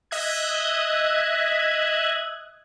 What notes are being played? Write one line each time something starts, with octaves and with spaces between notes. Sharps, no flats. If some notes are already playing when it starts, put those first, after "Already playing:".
D#5 E5 D#6 F#6 G#6